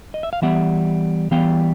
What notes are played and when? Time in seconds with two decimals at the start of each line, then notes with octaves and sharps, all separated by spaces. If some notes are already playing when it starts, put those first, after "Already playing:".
0.14 D#5
0.23 E5
0.33 F5
0.42 E3 G3 B3 E5 F#5
1.31 E3 G3 B3 F5 G5